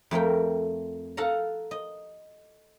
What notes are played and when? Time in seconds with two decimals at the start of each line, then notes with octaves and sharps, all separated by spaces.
0.11 F2 A3 A#4 G5
1.17 A4 F5 F#5 A#5
1.71 D#5